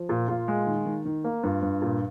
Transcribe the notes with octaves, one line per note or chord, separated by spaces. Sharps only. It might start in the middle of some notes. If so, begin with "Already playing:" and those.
Already playing: F3
A#2
A#2 F4
G#3
D#3
D#3
D#3
A#3
G2 F4
G2
A#2